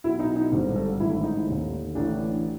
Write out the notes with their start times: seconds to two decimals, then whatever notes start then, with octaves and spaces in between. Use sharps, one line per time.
0.04 B1 E4
0.08 B2
0.19 D#4
0.36 D#4
0.52 G#1 G2 D3
0.76 A4
1.00 A1 G#2 D#3 E4
1.23 D#4
1.47 D#2 D3
1.95 A1 A2 E3 D4